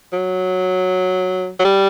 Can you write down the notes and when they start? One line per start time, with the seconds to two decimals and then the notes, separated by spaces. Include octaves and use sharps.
0.13 F#3
1.60 F#3
1.65 G3